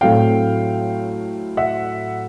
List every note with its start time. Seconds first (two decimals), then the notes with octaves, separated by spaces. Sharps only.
0.01 A2 F#3 A3 C4 F5 G5
1.57 E5 F#5